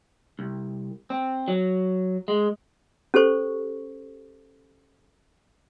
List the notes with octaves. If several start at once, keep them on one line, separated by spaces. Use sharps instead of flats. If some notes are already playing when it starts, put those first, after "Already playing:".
C2
C4
F#3
G#3
C#4 G4 A4 C5 C#6